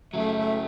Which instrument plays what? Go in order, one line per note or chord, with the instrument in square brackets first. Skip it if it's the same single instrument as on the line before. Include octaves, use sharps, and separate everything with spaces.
[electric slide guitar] F#2 C#3 F#3 [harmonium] A3
[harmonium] A3